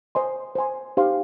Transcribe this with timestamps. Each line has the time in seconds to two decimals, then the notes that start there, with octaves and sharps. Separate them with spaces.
0.15 C5 D#5 G#5 C6
0.55 C5 D#5 G#5 C6
0.97 D#4 G4 C5 F5 C6